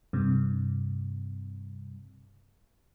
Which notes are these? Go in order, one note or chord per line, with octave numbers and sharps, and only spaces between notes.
G2 C3